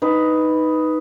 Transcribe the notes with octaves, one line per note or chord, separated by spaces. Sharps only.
D#4 B4